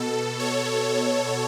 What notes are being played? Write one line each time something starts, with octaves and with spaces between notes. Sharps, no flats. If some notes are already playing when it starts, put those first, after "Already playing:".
Already playing: B2 A4
C#5